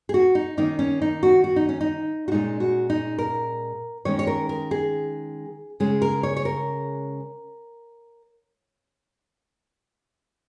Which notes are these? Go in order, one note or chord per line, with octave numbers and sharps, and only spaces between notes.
G#4
F#4
D#4
D#3 A#3 C#4 D#4
C#4
D#4
F#4
F#4
D#4
C#4
D#4
F#4
A#2 G#3 C#4 D#4
F#4
D#4
A#4
D#3 G#3 C#4 C#5
C#5
A#4
A#4
G#4
C#3 G#3 C#4 G#4
A#4
C#5
C#5
A#4